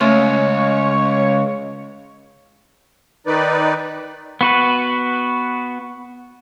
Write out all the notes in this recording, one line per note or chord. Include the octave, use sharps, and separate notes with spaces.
C#2 A3 C#4 C#5 C6
D#3 D#4 B4 D5
B3 F#4 B4